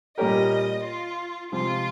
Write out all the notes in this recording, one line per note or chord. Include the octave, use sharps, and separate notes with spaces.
A#2 G3 C#4 G4 A#4 D#5
F4
C3 F3 G#3 C4 F4